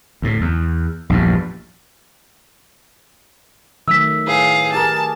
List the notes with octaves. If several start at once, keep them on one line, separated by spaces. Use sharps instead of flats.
D2 A2
E2
A#1 E2 G2
D#3 F#3 A3 E5 E6 B6
A2 G#4 B4 F5
G4 G#4 A#4 A5